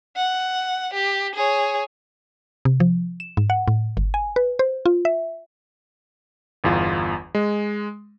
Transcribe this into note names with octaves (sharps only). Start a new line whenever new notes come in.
F#5
G4
G#4 C#5
C3
F3
E7
G#2
F#5
A2
G1
G#5
B4
C5
F4
E5
G1 E2 F4
G#3